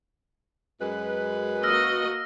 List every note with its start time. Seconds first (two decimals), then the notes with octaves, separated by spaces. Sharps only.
0.81 F#2 G#3 B4
1.63 A#3 F#4 D#5 E6 F6 A#6